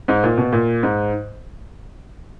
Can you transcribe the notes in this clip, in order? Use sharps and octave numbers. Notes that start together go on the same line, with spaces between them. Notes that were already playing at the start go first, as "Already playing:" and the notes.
G#2
A#2
B2
A#2
G#2